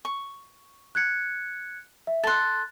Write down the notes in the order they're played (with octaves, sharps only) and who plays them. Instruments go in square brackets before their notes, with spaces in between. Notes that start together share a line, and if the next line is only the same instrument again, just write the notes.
[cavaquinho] C#6
[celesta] F#6 G#6 C#7
E5
[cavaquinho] A4 C6 [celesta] F#6 A6